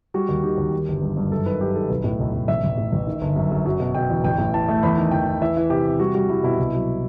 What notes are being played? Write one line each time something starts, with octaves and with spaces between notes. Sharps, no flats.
G3 F#4
D#2
D#3 G4
D#2
G3
G1
G2
G2
F#2 A4
D#3 B4
F#2 G4
D#3 A4
B1 B4
A2
B1
B1
A1 E5
A1
A2
A1
D#3
G1
F#2
F#2
F#3
B2
B2 G5
E2
A1 G5
A2
E3 A5
A3
E2 B5
D#3
E2 G5
E2
E3 E5
E3
C3 G4
C3
G3 F#4
G3 F#4
G3 E4
B2 E4
C2
F#3